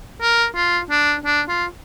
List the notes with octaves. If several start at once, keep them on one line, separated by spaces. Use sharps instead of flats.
A#4
F4
D4
D4
F4